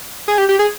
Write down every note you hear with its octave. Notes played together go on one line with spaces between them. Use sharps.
G#4
G4
G4
G#4